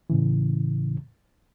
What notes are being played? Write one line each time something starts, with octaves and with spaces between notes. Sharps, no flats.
A2 C#3 E3